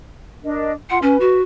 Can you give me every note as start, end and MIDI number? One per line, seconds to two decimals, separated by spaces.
0.44 0.72 62
0.44 0.72 70
0.44 0.72 75
0.90 0.99 65
0.90 0.99 78
0.90 0.99 84
1.02 1.17 61
1.02 1.41 71
1.20 1.42 66